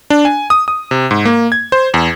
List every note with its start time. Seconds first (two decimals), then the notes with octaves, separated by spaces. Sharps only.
0.10 D4
0.25 G#5
0.50 D#6
0.68 D#6
0.91 C3
1.11 G#2
1.25 A#3
1.52 G#6
1.72 C5
1.94 E2